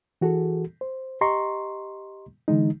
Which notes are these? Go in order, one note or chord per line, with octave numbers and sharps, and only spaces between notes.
E3 F#4 G#4 A4
C5
G4 D#5 A#5 C6 C#6
D3 E3 G#3 D#4